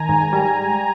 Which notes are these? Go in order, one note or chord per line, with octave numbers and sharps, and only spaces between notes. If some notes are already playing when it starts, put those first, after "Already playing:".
Already playing: D#3 G#5 A#5
G#2
G3